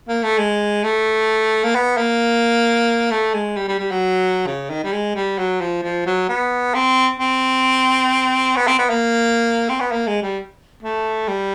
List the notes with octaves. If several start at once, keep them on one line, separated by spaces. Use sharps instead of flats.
A#3
A3
G#3
A3
A#3
B3
A#3
A3
G#3
G3
G3
G3
F#3
C#3
D#3
G3
G#3
G3
F#3
F3
F3
F#3
B3
C4
C4
B3
C4
B3
A#3
C4
B3
A#3
G#3
G3
A3
G3